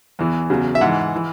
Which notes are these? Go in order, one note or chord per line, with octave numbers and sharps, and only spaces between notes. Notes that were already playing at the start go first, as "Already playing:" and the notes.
E2 E3
E2 C#3 F#3
E5
G#2 E3 F#5
E3